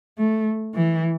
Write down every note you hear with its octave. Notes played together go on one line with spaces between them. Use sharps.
A3
E3